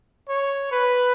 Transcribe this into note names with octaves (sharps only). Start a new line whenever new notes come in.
C#5
B4